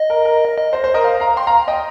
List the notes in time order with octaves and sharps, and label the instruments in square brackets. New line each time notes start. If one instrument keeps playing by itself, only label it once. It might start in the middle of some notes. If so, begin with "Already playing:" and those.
Already playing: [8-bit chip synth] D#5
[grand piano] A#4
A#4
[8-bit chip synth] D#5
[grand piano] C5
C5
A#4 D#5
C5 F5
F5 A#5
G5 C6
F5 A#5
D#5 G5